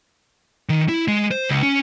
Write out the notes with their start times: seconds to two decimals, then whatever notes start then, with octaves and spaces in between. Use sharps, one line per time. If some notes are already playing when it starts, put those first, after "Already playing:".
0.69 D#3
0.89 E4
1.08 G#3
1.31 C5
1.49 C#2
1.63 C#4